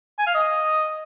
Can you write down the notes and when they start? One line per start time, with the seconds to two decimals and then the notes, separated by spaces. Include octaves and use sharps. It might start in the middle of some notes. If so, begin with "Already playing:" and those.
0.19 G#5
0.27 F5
0.35 D#5